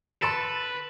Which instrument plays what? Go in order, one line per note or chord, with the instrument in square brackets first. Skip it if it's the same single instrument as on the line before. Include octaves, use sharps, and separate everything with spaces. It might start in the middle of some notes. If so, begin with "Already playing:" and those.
[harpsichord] A4 [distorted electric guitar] B4 [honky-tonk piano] B5 A6 D7